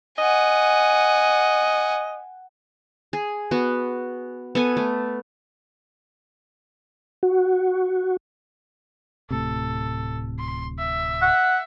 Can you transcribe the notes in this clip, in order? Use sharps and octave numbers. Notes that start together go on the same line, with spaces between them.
D#5 F#5 G#5
G#4
B3 F#4
B3 A4 G#5
A3
F#4
D1 A2 C3 A4
C6
E5
F#5